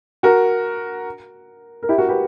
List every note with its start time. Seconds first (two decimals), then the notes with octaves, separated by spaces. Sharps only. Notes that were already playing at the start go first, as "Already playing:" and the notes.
0.23 F#4 A#4
1.83 A#4
1.89 E4 G4
1.98 F#4 A#4
2.09 G4 B4